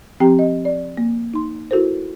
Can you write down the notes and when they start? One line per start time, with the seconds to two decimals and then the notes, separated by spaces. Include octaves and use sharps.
0.20 F3 C4 G4 G5 A#5
0.39 D#5
0.65 D5
0.97 A#3
1.34 D#4 C6
1.71 E4 F#4 A4 A#4 C5